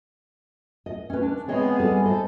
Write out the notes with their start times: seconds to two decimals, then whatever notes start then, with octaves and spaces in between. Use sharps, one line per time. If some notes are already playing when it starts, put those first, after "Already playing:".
0.86 D#5
1.10 C#4 B4
1.22 D4
1.48 G#3 B3 C4 G#4 C#5 D#5
1.80 G3 A4
2.05 A4 C5 D#5